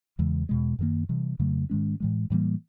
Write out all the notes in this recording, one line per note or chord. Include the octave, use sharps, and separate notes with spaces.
E2 C#3 E3 G#3
E2 B2 G#3
F#2 D#3 F#3 A#3
C3 E3 G3
F2 C#3 F#3 A3
G#2 D#3 G#3 C#4
A2 E3 G#3
A2 E3 G3 A#3